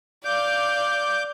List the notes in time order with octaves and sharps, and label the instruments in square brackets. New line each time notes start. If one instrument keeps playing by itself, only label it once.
[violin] D5 F5 [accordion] D6 G6